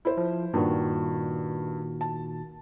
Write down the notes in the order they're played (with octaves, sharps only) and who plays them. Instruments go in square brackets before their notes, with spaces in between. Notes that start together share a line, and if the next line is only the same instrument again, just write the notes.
[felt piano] E4 C5
[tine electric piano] F3
[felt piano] G2 [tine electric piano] A#2 D#3 F#4
[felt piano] A5